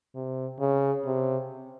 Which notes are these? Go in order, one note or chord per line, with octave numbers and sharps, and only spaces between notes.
C3
C#3
C3